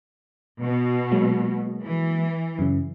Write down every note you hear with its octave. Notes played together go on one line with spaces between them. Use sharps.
B2
F#3 G#3 A#3
E3
F#2 C#3